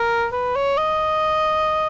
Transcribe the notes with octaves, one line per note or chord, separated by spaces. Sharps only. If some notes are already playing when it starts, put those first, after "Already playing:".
Already playing: A#4
B4
C#5
D#5